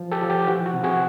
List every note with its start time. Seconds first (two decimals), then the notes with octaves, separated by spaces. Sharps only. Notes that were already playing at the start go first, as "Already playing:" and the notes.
Already playing: E3 F3
0.12 G4 A4
0.21 F3
0.30 G4
0.47 E3 F#4
0.66 F#4
0.74 C3
0.84 F#4 G#4